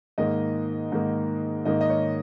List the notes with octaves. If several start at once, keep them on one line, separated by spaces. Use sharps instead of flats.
G#2 D#3 A#3 D#5
G#2 D#3 A#3
G#2 D#3 A#3 D#5
D#5
C#5